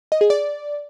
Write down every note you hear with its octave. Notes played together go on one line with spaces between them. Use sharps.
D#5
G#4
D5